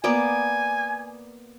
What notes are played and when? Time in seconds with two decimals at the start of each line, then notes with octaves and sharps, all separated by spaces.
0.04 A#3 B3 D5 G#5